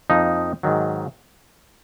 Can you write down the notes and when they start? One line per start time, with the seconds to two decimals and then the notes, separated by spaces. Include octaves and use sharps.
0.10 F2 F3 A#3 D#4
0.63 G#2 D#3 F#3